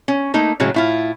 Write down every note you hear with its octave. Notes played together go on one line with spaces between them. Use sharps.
C#4
A3 A#3 D#4
A2 C#3 F#3 G#3
A2 E4 F4